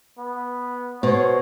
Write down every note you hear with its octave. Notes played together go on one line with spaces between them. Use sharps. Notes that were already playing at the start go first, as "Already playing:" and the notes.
B3
B2 C5 C#5